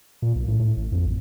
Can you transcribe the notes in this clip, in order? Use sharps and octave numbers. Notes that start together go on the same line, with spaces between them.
A#2
B1
A2
A2
A1
F2
A1